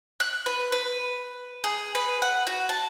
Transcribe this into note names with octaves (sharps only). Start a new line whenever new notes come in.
F#6
B4
B4
G#4
B4
F#5
F#4
A5